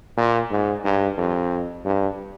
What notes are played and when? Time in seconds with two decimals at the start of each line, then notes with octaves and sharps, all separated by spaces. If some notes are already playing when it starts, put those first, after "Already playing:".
0.17 A#2
0.51 G#2
0.84 G2
1.18 F2
1.85 G2